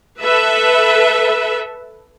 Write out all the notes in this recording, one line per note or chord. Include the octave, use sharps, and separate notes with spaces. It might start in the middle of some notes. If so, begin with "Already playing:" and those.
A4 B4 E5